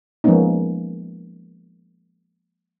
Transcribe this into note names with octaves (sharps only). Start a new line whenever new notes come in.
F3 G#3 A#3 B3 C#4 D#4